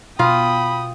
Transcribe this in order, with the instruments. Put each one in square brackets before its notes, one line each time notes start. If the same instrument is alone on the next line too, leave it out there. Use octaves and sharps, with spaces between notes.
[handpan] B2 [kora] F4 [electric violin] G5 D#6 [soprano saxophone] B5